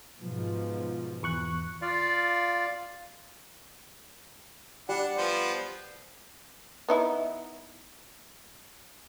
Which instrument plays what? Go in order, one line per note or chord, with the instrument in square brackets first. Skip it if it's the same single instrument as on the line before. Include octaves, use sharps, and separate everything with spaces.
[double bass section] G#2 B2 F3
[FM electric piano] E2 C#6 F#6
[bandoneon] F4 D5 F5
[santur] G3 [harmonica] D4 F#5
[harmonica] F3 B3 C5
[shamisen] B3 D#4 E4